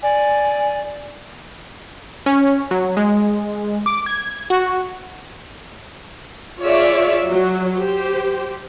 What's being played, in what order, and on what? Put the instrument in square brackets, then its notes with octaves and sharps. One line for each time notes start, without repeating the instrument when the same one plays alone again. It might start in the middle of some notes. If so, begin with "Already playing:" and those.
[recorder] D5 [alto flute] G#5
[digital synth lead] C#4
F#3
G#3
D6
G#6
F#4
[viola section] F4 G#4 C#5 D5 E5
F#3
G4 C5